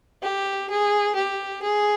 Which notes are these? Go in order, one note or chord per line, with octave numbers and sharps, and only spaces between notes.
G4
G#4
G4
G#4